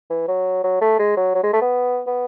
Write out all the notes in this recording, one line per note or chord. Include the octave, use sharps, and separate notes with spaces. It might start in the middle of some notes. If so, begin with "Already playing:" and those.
E3
F#3
F#3
A3
G#3
F#3
F#3
G#3
A3
B3
B3